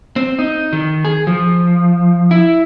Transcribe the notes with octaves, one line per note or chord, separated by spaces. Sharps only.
C4
D#4
D#3
G#4
F3
E4